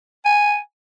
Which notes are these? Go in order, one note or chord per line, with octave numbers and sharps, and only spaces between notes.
G#5